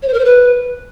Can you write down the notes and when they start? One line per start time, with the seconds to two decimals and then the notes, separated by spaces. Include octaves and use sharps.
0.02 C#5
0.07 C5
0.13 A#4
0.19 C5
0.24 B4